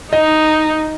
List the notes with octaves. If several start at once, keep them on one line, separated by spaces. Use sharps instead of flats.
D#4 D#5